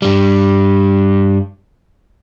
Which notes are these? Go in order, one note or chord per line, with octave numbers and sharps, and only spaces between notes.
G2 G3